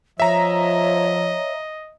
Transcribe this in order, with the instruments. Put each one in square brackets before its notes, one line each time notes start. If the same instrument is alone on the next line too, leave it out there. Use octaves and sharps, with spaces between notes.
[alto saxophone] F3 [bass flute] C#5 [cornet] D#5 [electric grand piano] E5 A#5